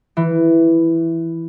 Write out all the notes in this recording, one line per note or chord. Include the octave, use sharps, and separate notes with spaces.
E3